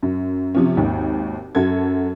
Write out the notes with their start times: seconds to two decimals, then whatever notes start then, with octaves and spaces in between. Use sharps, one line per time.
0.03 F#2
0.55 C3 F3 C#4
0.77 G#1 D#2
1.55 F#2 F#4 A4 G#6